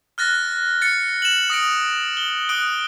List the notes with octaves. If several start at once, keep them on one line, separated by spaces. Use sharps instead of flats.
F6 F#6 A6 A#6
A6 C#7
E7 F#7
D#6 A#6 C#7 D7
G7
D#6 F#6 D7 G7